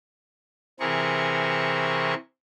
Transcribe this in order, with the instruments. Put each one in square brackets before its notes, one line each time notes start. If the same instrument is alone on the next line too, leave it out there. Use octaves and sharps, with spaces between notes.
[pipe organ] C3 E3 C4 G#4 A#4 C#6